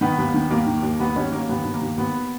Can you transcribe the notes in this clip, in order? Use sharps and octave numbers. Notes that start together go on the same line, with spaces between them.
D#3 B3
D#2
D#3
D#2 A#3
D#3
D#2
D#2 B3
D#2 C#4
D#2 A#3
D#2 B3
D#2
A#3
D#2
D#2 B3